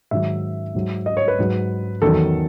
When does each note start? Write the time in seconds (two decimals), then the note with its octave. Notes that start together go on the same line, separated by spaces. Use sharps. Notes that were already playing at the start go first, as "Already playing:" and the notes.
0.11 G#2 D#3 F#3 E5
0.75 G#2 F#3
1.06 D#5
1.17 C#5
1.28 B4
1.39 G#2 F#3
2.02 E2 D#3 F#3 A4